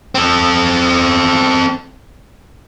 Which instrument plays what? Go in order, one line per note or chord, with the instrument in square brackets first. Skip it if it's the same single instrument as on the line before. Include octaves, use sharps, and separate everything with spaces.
[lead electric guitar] C4 A4